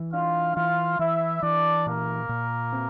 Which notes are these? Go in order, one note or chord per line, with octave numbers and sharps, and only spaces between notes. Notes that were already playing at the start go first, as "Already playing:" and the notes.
Already playing: E3
D4 F4 F5
E3 F4 F5
E3 E4 E5
E3 D4 D5
A#2 A#3 A#4
A#2
C4